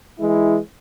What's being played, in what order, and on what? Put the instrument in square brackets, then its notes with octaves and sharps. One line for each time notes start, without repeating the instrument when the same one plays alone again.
[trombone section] E3 G#3 E4